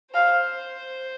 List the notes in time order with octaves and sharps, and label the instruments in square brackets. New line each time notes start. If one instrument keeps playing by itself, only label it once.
[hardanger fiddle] C5 [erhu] F5